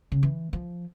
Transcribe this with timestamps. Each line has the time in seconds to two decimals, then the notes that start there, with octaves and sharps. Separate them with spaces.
0.12 C#3
0.23 E3
0.53 F3